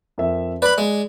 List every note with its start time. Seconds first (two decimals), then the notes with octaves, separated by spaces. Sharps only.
0.18 F2 A#4 E5
0.62 B4 D5 B5
0.78 G#3